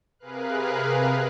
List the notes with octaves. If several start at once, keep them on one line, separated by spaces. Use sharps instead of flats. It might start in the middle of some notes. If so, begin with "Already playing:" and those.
C3 G#4 A#4 B4 F5 F#6